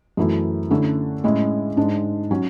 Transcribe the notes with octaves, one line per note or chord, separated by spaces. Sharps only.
F#2 E3 A3 E4
D3 A3 C#4 E4
A2 G#3 C#4 E4
G#2 G#3 D4
F#3 C#4